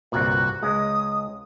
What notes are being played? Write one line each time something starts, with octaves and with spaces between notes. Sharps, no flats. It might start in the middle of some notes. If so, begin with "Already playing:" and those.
G1 C2 A#2 F#4
C#2 G#3 D#6